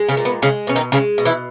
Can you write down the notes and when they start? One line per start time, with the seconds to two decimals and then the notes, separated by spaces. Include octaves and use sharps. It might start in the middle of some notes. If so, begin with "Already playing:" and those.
Already playing: G#3
0.09 C#3 C#4
0.17 A#2
0.25 B3
0.42 C#3 G#3 C#4
0.67 B2 C#4
0.76 D#3 D#4
0.92 C#3 G#3 C#4
1.18 B2
1.25 E3 E4